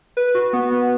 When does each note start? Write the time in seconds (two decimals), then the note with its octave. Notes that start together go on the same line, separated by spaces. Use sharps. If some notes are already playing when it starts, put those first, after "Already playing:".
0.17 B4
0.35 F#4
0.53 B3
0.71 B3